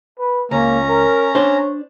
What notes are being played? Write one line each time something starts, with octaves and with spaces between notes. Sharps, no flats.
B4
C#2 A#3 C#4 A#5
A#4
D4 C5 C#5